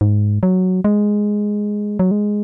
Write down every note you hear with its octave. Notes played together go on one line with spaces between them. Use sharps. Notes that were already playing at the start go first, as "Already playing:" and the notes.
G#2
F#3
G#3
F#3
G#3